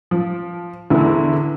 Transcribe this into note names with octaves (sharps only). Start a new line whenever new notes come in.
F3
E2 D3 E4